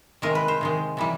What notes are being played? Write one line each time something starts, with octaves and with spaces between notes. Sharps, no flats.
C3 D#3 G#3 A#4
B4
C5
C3 D#3 G#3
C3 E3 G3